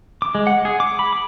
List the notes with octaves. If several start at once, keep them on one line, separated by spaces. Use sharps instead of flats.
D6
G#3
F#5
G#4
D6
B5
D6